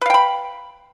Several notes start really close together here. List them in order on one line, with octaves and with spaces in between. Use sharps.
B4 F5 G5 B5